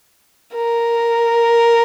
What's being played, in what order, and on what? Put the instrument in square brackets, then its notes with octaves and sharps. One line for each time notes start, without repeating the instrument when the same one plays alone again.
[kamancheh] A#4